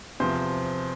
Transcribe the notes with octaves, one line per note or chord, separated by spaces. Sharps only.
E2 C3 F3 C5